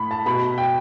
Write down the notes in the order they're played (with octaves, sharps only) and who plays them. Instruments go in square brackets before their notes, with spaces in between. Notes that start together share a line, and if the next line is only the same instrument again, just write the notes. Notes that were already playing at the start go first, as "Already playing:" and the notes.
Already playing: [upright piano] A2 B5
A5
B2 B5
G5